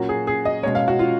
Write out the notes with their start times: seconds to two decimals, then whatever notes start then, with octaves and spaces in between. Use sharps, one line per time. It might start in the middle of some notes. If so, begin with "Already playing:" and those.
Already playing: A#2 F#3 A#3 C#4 F#4
0.09 G#4
0.27 G#4
0.45 D#5
0.63 B2 G#3 C#4 C#5
0.75 F5
0.88 F#4
0.99 F4